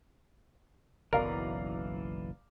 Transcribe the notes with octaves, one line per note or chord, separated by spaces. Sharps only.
F#1 B1 B2 E3 A#4 D5 F5 A#5